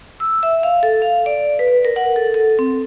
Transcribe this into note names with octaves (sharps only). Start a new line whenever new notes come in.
E6
E5
F5
A4
F5
D5
B4
A#4
F#5
A4
A4
C4